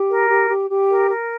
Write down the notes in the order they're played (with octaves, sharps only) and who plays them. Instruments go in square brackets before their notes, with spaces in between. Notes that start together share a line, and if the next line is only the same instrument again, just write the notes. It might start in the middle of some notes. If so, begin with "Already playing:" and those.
Already playing: [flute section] G4
A#4
G4
G4
G4
A#4
A#4